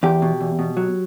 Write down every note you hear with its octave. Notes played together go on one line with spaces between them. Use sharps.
E2 G4
B2
E2
B2
F#3